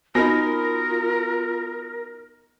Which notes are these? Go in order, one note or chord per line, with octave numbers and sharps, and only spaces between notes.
B3 D#4 F4 F#4 A#4 B5 A#6